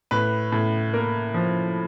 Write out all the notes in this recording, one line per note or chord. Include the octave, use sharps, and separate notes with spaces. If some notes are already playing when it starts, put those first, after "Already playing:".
A2 B4
A2
A#3 A#4
F3